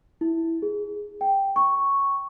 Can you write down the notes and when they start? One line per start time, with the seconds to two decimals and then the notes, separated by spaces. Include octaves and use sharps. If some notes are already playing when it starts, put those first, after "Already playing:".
0.21 E4
0.62 G#4
1.21 G5
1.56 C#6